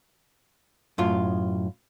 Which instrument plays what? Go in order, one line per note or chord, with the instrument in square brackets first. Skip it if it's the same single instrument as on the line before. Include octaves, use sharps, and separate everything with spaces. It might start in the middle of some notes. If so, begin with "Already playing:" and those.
[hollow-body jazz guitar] F#2 A2 F4